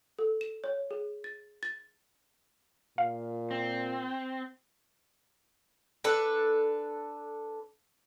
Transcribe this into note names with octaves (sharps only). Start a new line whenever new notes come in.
A4
E7
C#5
G#4
A6
A6
A#2 F5
C4
D4 A4 B4